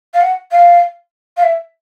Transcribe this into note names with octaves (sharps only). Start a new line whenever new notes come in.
F5
F#5
F5
F5
E5